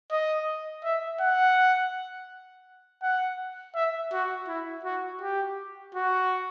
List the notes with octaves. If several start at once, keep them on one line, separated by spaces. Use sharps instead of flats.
D#5
E5
F#5
F#5
E5
F#4
E4
F#4
G4
F#4